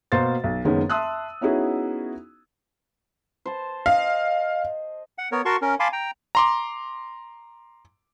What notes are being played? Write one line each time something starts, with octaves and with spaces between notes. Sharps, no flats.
B2 A#3 C5 F5 C6 A6
B1
F#1 D#3 G#3 B3 C#4
E5 A5 C6 D#6 E6 F#6
B3 C#4 D#4 E4 F#4 G#4
C5 A5
D#5 F5
F#5
B3 A#4 C#5
F#4 A#4 A5 C6 C#6
C#4 A#4
F5 G#5 A5 B5 C6 D6
G5 A#5
A#5 C6 D6